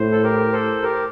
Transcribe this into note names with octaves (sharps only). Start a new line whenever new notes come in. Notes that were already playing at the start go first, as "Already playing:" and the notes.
Already playing: A2 C5
A4
G4 A#4
A4 C5
G4 A#4